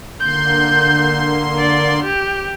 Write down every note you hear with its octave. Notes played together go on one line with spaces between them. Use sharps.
D3 A#3 C6 G6
D5
G4